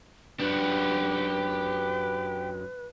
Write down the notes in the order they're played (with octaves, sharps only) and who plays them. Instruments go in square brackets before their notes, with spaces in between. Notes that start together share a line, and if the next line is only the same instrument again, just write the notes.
[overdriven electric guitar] F#2 D4 [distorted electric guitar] G4 F#5 [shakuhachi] B4